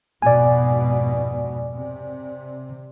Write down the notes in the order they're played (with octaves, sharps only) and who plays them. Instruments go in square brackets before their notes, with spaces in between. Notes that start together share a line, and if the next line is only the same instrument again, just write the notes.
[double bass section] F2 G#2 B2 [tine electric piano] D5 G#5
[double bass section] C3